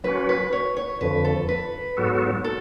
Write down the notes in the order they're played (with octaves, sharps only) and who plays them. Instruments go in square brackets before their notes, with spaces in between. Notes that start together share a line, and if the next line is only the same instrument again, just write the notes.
[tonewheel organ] F#3 C#4 F#4 [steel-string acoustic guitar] B4
[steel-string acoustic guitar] B4
C#5
C#5
[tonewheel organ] F2 D3 F3 [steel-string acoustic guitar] B4
[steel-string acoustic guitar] A4
B4
[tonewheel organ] G#2 F#3 B3 F#4 A4
[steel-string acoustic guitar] A4